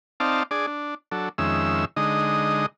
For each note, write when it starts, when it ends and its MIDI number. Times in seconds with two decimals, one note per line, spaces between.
0.20 0.43 60
0.20 0.43 63
0.20 0.43 74
0.20 0.43 77
0.20 0.43 81
0.51 0.66 62
0.51 0.66 68
0.51 0.66 74
0.67 0.95 62
1.12 1.29 54
1.12 1.29 62
1.12 1.29 69
1.38 1.85 41
1.38 1.85 51
1.38 1.85 56
1.38 1.85 61
1.38 1.85 76
1.38 1.85 88
1.96 2.66 50
1.96 2.66 56
1.96 2.66 63
1.96 2.66 75